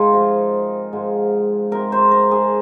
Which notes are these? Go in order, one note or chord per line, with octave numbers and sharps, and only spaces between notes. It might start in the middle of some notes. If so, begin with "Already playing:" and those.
Already playing: G#2 G#3 D#4 F4 G#4 A#4
C3 F3 C4
G#2 F3 G#3
C3 G#3 C4 A#4
C5
A#4
G#4